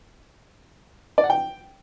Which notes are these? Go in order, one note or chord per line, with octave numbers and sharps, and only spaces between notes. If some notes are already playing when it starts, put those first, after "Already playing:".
D5
F#5
G5